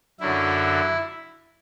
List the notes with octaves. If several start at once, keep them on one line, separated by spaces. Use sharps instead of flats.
F#2 D3 F#3 E4